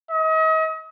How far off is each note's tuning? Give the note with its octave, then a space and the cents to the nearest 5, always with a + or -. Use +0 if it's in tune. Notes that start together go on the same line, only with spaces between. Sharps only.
D#5 +40